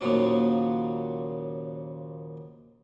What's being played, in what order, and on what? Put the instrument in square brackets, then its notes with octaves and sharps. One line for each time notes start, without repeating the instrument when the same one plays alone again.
[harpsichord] D#2 A#2 C#3 F3 F#3 C#4